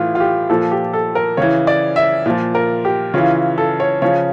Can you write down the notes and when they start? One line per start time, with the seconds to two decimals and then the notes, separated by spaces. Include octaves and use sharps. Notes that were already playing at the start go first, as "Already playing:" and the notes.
Already playing: A2 E3 F4
0.15 F4
0.20 G4
0.49 A#2 F3 A4
0.72 G4
0.93 A4
1.15 A#4
1.37 C#3 E3 C#5
1.67 D5
1.96 E5
2.26 A#2 F3
2.55 A#4
2.85 G4
3.14 C#3 E3 F4
3.58 A4
3.80 C#5
4.02 C#3 F3 C#5